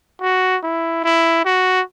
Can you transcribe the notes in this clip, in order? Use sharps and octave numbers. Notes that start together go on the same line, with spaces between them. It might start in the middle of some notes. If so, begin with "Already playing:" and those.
F#4
E4
E4
F#4